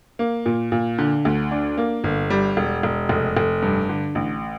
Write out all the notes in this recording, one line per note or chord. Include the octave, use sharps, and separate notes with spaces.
A#3
A#2
A#2
D3
D2
D4
A#3
G1
G3
E1
E1
F1
F1
G2
D3
A1